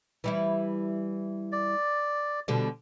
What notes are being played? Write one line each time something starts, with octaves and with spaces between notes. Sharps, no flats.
E3 G3 E4
D5
B2 D3 G3